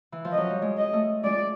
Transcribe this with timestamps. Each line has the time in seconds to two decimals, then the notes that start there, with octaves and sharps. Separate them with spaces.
0.12 E3
0.25 F3
0.32 D#5
0.38 F#3
0.50 G3
0.62 G#3
0.77 D#5
0.93 A3
1.24 G#3 D5